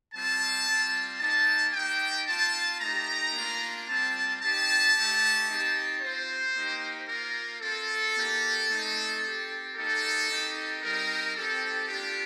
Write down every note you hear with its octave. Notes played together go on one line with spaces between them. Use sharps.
G3 C4 F4 A5
G3 C4 F4
A#3 D#4 G4 A5
A#3 D#4 G4 G5
C4 F4 A5
A3 D#4 G4 A#5
A#3 D4 F4
G3 C4 F4 A5
C4 D#4 G4 A5
A3 D#4 G4
C4 D#4 G4
C4 F4 C5
A#3 D#4 G4
A#3 F4 A#4
C4 F4 A4
A#3 D#4 G4
A3 C4 D#4
C4 G4
A#3 D#4 G4 A4
C4 D#4 G4
G3 C4 D#4 G4 A#4
C4 D#4 G4 A4
A#3 D4 F4 G4